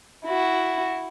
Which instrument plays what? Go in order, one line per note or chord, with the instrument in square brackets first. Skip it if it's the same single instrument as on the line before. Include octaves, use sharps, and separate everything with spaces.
[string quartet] E4 F#4